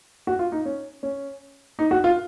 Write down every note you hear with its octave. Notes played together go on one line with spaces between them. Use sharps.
F#4
F4
D#4
C#4
C#4
D#4
F#4
F4